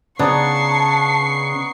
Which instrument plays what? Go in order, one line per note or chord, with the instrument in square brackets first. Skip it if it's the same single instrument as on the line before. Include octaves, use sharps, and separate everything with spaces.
[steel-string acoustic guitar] C#3 [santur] B3 D4 D#4 [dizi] A5 [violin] C#6 C7